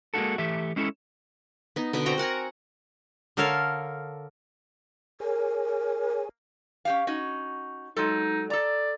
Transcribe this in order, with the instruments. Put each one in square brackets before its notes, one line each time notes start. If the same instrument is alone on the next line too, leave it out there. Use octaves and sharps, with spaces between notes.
[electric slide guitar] G#3 A#3 C#4 E4 F#4 A4
E3 A3 G4 E5
G#3 C#4 E4 A4
[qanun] B3 D#4
B2 D3 B3
C4 F#4 G5 A#5
A#4 F#5 G#5 A#5
[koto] D3 A4 A#4 C#5 F5
[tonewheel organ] G#4 C#5 G#5 [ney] A#4
[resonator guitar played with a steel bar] C#4 G4 F5
C#4 D#4 F#4
[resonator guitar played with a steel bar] F#3 G#3 A4 [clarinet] D#4
[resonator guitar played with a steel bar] A4 A#5 [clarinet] D5